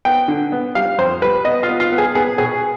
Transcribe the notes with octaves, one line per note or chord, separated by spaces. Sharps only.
B3 G5
D3
B3
G3 F5
F2 C5
G3 B4
B3 D#5
F4
B3
F4
B3
G#4
B3 G#4
B2 G#4